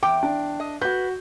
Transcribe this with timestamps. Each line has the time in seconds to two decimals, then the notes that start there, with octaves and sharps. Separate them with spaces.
0.03 E2 G5 D6
0.23 D4
0.60 D#5
0.82 F#4 B4 G6